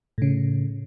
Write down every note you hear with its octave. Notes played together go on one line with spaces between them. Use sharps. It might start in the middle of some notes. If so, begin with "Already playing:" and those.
A2 C#3